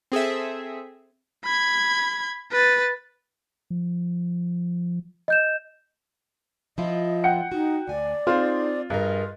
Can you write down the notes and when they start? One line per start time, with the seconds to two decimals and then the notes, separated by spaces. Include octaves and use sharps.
0.12 C4 G#4 A4 E5
1.44 B5 G#6
2.51 B4 A6
3.70 F3
5.28 D#5 G6 E7
6.78 F3 E4 F4 D#5
7.24 F#5 G5 C#7
7.52 D#4 F#4
7.88 D2 D5 G#5
8.27 C4 D#4 F4 G#4
8.90 G2 G#4 A#4 D#5